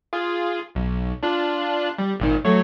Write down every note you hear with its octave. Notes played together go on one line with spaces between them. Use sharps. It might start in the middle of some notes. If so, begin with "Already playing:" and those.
F4 G#4
B1
D4 F4 F#6
G3
G#1 A#2 D#3
F#3 A3 C#5